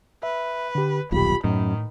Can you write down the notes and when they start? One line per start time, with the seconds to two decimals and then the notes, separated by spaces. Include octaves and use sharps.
0.23 B4 E5
0.75 D3 G4
1.12 D#1 B1 F4 G4 B5
1.44 F#2 A2 D#3